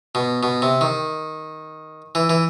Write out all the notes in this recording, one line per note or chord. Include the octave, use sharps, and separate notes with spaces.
B2
B2
C3
D#3
E3
E3